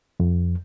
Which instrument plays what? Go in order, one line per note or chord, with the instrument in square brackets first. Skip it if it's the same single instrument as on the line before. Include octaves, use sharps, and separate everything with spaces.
[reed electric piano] F2